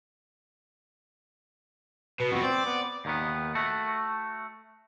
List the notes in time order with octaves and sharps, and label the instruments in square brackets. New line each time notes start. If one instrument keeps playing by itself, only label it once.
[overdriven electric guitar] B2 [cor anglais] B4
[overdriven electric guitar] F2 B2 [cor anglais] F#4
[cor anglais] C4 [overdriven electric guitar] D5
[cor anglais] B3
[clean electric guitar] D#2 D#3 B3
A3 F#4